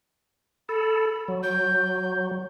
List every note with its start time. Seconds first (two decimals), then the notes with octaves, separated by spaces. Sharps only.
0.69 A4 B5
1.28 F#3
1.43 G6